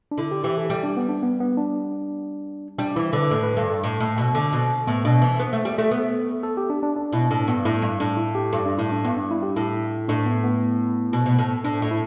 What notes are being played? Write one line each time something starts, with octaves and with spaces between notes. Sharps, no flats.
D4
D3 E4
G4
E3 G4
A4
G3 G4
D4
B3
D4
B3
B3
D4
G3 D4
E3 E4
D3 B4
A2 A4
B4
G2 A4
A4
A2
A2
B2
D3
B2
A2 B3
B2 D4
E3
B3
A3
G3
A3
B3
A4
G4
D4
D4
D4
B2 E4
A2 D4
G2 B3
A2 E4
G2
A2 D4
E4
G4
G2 A4
D4
A2 E4
D4
G2 B3
D4
E4
G4
A2 E4
A2 D4
B3
B3
B2
B2
A2
A2 D4
A2
E4